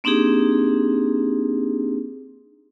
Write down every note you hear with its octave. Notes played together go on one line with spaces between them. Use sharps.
A#3 C4 D4 D#4 G4 G#4